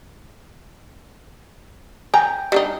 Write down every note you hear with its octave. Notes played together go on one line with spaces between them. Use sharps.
G5 G#5 A#5
G3 D4 D#4